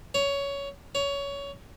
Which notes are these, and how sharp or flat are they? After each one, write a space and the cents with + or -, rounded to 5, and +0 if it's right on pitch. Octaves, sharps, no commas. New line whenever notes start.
C#5 +15
C#5 +20